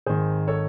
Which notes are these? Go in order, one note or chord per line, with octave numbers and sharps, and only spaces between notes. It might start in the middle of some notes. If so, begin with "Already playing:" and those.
G#1 G#2 D#3 G#4 C5
A4 C#5